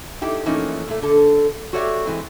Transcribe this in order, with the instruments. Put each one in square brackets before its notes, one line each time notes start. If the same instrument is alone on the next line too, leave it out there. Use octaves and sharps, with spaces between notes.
[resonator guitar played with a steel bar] D#4 E4 G4 A4
E3 F3 A3 A#3 C#4 D#4
A#2 A3
D3 A4
F#4 G4 A4 C#5 D5 E5
E3 G#3 C4